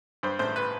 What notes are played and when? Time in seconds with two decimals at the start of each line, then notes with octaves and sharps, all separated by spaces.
0.23 G2 C5
0.39 A1 C5
0.56 B4